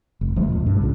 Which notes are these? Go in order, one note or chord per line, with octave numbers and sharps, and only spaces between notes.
F1
D2 F3 G#3 A3
A#2
G2
C2 A#2 C#3